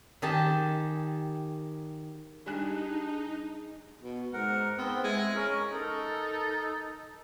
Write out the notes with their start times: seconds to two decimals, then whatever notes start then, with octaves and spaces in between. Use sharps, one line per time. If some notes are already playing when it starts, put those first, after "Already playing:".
0.22 D#3 G4 G#4 A5
2.46 G3 D4 D#4 G#4 G#5 F#6
4.01 B2
4.33 G#2 A#4 F#5
4.78 B3 C4
5.04 G#3 E4
5.36 C#4 A#4
5.72 D#4 A4 A#4